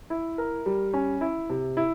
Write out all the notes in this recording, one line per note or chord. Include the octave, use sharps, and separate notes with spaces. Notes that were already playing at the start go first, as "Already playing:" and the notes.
E4
A#4
G3
C#4
E4
C3
E4